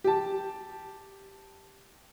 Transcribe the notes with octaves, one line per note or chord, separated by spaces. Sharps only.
G4 A5